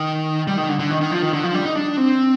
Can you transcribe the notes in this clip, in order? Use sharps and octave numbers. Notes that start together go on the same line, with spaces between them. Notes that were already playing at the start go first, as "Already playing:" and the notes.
Already playing: D#3
G3
D#3
D3
D3
D#3
D#3
F3
D#3
D3
F3
G3
D#4
D4
C4